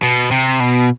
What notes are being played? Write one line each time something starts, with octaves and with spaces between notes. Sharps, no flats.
B2
C3
B2